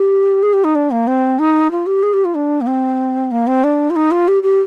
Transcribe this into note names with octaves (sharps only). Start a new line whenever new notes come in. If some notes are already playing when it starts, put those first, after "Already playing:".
Already playing: G4
G#4
G4
D#4
D4
A#3
C4
D#4
F4
G4
G#4
G4
F4
D4
A#3
C4
A#3
C4
D4
F4
D#4
F4
G4
G4